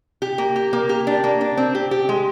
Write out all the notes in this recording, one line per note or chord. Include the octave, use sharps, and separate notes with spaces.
G4
A#3
G4
A#3
G4
D4
A#3
D4
C4
G4
G4
G#3